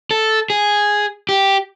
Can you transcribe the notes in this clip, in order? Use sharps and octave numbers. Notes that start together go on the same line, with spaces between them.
A4
G#4
G4